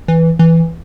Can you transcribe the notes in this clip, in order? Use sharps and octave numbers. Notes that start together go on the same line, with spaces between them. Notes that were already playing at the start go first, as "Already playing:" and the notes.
E3
E3